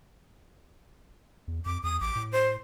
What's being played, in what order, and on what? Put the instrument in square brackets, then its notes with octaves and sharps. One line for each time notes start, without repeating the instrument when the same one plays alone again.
[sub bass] E2
[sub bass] F2 [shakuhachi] D6
[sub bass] E2 [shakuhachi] D#6
[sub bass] A1 [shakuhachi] D6
[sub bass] A2
[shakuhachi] C5